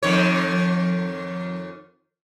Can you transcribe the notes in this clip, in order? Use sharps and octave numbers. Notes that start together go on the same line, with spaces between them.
F2 D#3 C#5